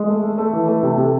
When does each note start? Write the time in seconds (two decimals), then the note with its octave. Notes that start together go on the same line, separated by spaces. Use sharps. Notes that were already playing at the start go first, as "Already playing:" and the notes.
Already playing: G#3
0.08 A3
0.23 A3
0.38 A3
0.53 E3
0.68 A3
0.83 C3
0.97 C3